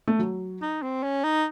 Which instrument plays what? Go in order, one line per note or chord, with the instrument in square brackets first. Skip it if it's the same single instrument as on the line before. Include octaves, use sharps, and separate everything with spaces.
[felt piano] A3
F#3
[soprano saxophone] D#4
C4
C#4
D#4